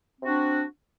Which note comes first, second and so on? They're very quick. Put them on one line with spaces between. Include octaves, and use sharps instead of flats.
C4 F#4 D4